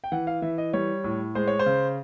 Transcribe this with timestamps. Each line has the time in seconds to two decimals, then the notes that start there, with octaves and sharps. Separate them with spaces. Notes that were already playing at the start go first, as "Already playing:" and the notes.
0.04 G5
0.12 E3 F#5
0.27 F5
0.42 E3 E5
0.58 D#5
0.73 G3 C#5
1.04 A2
1.35 G#3 C5
1.48 C#5
1.59 C5
1.66 C#3